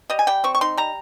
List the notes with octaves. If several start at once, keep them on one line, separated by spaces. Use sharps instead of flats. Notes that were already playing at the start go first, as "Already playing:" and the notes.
G3 D#5
G#5
G3 G5
C4 C#6
C#6
D#4 C6
G3 A#5